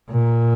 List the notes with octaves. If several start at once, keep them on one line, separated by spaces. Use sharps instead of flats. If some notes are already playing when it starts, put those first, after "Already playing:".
A#2